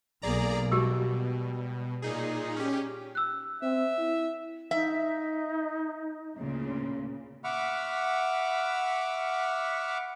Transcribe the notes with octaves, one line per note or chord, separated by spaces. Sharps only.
B1 A#3 G#4 D5 A#5
B2 G3 G#3 F#4 G4
A#2 D#4 G#4
C#4 G4
E6 F#6
C4 E5
E4
D#4 E5
D2 A#2 C#3
E5 F#5 B5 C#6 D6 F6